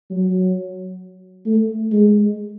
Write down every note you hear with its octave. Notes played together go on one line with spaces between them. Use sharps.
F#3
A3
G#3